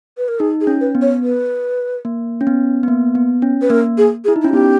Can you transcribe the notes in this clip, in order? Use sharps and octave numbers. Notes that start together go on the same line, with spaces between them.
B4
A#4
D#4 G#4
G#4
C#4
B4
B3
C#5
B4
A#3
C#4
B3
B3
A#3
B3
C#4
B4
A#3 A#4
G#4
G#4
E4
D#4
C#4 E4
B3 G4